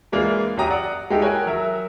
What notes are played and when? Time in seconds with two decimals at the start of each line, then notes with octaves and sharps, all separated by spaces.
0.12 E3 G#3 A#3 D4 F4
0.57 F#2 F#3 G4 A#5 D#6
0.70 D5 F#5
1.10 G#3 D#4 E4 G4 A4
1.22 F#4 A#4 C#5 G5 G#5
1.46 F#3 A#4 E5